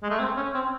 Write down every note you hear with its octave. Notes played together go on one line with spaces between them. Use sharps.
G#3
A3
C4
C#4
C4